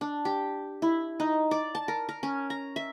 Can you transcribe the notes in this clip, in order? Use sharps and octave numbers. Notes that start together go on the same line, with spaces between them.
D4
G4
E4
D#4
D5
A5
A#4
A#4
C#4
A#5
E5